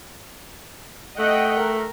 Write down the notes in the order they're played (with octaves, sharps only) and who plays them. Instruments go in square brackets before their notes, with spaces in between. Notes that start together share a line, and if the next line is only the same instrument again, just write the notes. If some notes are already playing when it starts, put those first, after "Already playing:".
[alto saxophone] A3 [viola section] D#5 F#5 G5
[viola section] A#4